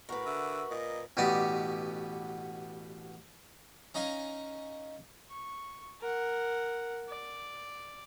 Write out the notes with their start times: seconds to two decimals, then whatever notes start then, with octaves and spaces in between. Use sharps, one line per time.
0.09 A2 F#4 A#4 B4
0.26 D3 E5
0.71 A#2 D#5
1.17 A1 B2 B3 G4 D5 D#5
3.95 C#4 D#4 D#5 F5 G#5 A#5
5.30 C#6
6.01 A#4 F#5
7.09 D5